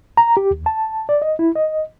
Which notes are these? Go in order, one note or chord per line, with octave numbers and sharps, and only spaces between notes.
A#5
G4
D#2
A5
D5
D#5
E4
D#5